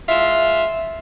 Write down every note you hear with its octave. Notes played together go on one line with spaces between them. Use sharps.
G#3 F4 E5